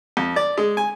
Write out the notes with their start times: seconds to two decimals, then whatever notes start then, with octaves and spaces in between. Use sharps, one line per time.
0.17 F2
0.36 D5
0.57 G#3
0.77 G#5